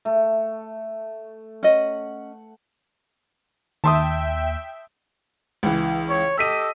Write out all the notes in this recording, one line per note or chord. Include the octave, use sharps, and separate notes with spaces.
A3
C#4 D#5 F#5
D#2 E5 G5 A5 C6 D#6
C#2 E3
C#5
G4 A4 D#5 E6 B6 D#7